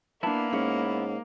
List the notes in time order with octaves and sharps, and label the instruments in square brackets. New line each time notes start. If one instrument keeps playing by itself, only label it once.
[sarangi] A#3 [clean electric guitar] B3 E4 [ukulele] D4 A5
[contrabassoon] G#2 [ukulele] C#4 F#5